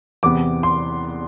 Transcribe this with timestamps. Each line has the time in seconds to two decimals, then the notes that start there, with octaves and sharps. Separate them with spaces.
0.23 E2 C3 E3 B3 D6
0.63 C6